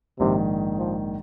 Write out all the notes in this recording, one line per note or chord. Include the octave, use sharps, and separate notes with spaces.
A#1 G#2 C3 D#3
F3